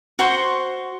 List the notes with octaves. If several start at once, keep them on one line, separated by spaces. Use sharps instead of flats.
F#4 C5 C6 C#6